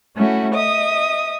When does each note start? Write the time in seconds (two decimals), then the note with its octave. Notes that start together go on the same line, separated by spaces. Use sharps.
0.15 A3 C#4 E4 F#4
0.53 D#5 E5 D#6